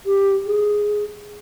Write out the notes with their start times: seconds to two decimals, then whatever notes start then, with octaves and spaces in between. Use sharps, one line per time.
0.06 G4
0.47 G#4